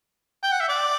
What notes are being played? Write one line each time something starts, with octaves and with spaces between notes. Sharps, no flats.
G5
F#5
E5
D5